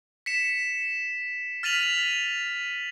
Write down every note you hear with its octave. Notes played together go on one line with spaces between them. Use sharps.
B6 C#7 E7
F6 A6 B6 D#7 F7 F#7